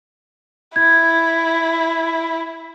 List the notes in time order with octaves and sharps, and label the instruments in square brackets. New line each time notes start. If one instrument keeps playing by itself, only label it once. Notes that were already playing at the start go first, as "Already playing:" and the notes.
[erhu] E4 [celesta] G#6